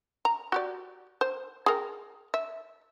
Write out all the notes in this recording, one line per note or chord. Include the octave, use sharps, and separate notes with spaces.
A#5
F#4 G4 D5
C5
G#4 A#4 G5
E5